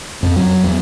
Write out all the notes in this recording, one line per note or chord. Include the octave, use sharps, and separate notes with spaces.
F2
F#3
E2